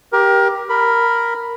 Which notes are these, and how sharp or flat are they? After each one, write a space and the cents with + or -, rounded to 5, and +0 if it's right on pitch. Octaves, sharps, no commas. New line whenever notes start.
G4 +0 A#4 +25
A#4 +0 B5 +0